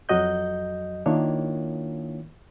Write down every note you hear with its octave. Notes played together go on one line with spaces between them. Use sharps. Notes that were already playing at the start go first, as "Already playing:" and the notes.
F2 F#3 F#4 D#5 G6
D#3 A#3 D4 E4 F4 C#5